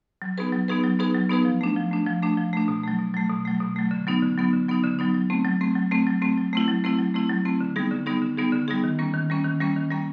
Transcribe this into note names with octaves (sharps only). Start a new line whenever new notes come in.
F#3
B3 D#4 G#4 B4
F#3
B3 D#4 G#4 B4
F#3
B3 D#4 G#4 B4
F#3
B3 D#4 G#4 B4
F3
A3 D4
F3
A3 D4
F3
A3 D4
F3
A3 D4
B2
F#3 A3
B2
F#3 A3
B2
F#3 A3
B2
F#3 A3
D3
F#3 B3 D#4
D3
F#3 B3 D#4
D3
F#3 B3 D#4
D3
F#3 B3 D#4
F#3
A3 C4
F#3
A3 C4
F#3
A3 C4
F#3
A3 C4
F#3
A3 C4 E4
F#3
A3 C4 E4
F#3
A3 C4 E4
F#3
A3 C4 E4
D3
G3 B3 D#4 G#4
D3
G3 B3 D#4 G#4
D3
G3 B3 D#4 G#4
D3
G3 B3 D#4 G#4
D#3
G3 A#3 C#4
D#3
G3 A#3 C#4
D#3
G3 A#3 C#4
D#3
G3 A#3 C#4